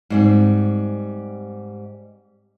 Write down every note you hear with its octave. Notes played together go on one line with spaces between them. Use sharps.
G#2 G3 C4